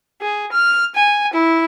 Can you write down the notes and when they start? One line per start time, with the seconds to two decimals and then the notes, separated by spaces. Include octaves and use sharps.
0.22 G#4
0.52 F6
0.95 G#5
1.33 E4